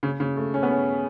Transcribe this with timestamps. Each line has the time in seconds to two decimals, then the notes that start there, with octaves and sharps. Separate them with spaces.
0.03 C#3
0.20 C#3
0.37 A3
0.54 C#4
0.63 B3
0.71 C#4